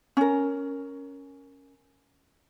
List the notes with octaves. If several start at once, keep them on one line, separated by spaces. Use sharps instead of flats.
C#4 A#4